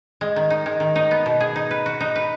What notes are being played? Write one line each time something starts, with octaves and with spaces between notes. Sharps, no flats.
G#3
D#3
D#4
G#3
D#3
D#4
B3
B2
G#4
D#4
B4
F#4
D#4
B4